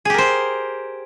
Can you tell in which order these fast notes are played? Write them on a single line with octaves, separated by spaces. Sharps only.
G#4 G4 A#4 C5